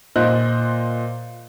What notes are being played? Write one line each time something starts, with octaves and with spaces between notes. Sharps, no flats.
A#2 C5 D#5 F#6